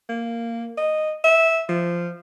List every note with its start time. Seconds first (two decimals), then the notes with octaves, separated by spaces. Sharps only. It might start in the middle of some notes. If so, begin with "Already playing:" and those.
0.09 A#3
0.77 D#5
1.24 E5
1.69 F3